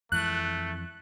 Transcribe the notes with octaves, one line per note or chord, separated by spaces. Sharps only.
F2 E3 G#3 A3 F#6